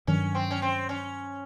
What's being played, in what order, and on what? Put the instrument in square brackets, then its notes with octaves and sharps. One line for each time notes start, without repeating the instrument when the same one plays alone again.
[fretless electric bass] G2 D#3 F#3 [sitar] C#4
[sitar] C4
C#4
C4
C#4